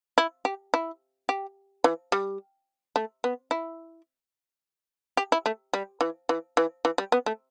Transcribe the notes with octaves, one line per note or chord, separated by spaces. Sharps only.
E4
G4
E4
G4
E3
G3
A3
B3
E4
G4
E4
A3
G3
E3
E3
E3
E3
G3
B3
A3